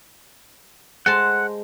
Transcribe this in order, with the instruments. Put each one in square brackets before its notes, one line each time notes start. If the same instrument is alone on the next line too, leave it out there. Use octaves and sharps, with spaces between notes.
[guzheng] G#3 C5 A5 [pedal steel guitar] F#5